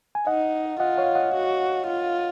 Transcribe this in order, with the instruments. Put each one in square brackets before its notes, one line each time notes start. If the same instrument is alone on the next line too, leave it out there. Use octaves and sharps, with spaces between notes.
[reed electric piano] G#5
[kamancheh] D#4 [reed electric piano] D#5 F#5
[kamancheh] F4 [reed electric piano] D#5 F#5
[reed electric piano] C#5 F5
D#5 F#5
[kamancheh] F#4
F4